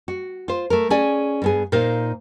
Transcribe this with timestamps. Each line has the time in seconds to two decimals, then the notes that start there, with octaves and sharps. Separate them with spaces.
0.08 F#4
0.48 F4 C5
0.70 A3 A#4
0.90 C#4 G#4 D5 G#5
1.42 G2 B3 G#4
1.72 A#2 D#4 A#4 C5 F5